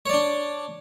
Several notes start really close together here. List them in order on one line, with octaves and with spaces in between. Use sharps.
C#5 D5 D4